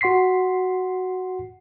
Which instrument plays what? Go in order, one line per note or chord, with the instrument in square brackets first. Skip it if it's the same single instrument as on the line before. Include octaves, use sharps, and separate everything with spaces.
[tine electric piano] F#4 F#5 C6 B6 C7